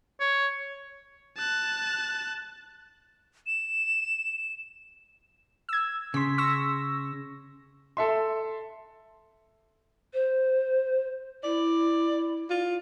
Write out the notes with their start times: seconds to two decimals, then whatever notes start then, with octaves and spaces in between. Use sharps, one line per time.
0.20 C#5
1.37 A5 F#6
3.47 E7
5.69 E6 G#6
6.14 C#3 C6 B6
6.38 C#6 E6 A#6
7.97 A4 E5 C6
10.13 C5
11.44 E4 D5
12.50 F4